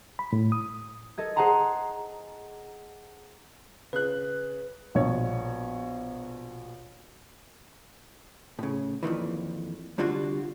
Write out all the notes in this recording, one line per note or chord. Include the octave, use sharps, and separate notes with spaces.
B5
A2
D#6
A4 D#5 G#6
G#4 C5 F#5 A5 A#5 C6
C#3 B4 F#6
A#1 B2 C#5
A2 C#3
F2 A#2 D#3 E3
C2 D3 G3 F4 F#4